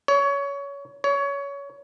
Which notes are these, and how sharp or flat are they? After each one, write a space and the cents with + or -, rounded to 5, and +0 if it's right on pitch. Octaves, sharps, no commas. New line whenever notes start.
C#5 +20
C#5 +20